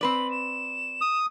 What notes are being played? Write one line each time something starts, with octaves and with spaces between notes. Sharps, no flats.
C4 B4 D5 F#7
E7
D#6